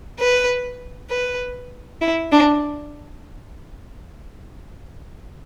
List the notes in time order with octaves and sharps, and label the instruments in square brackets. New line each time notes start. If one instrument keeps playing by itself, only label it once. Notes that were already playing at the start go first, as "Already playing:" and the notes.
[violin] B4
B4
E4
D4